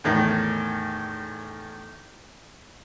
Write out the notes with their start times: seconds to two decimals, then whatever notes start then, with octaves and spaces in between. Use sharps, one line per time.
0.04 E2 A2 D#3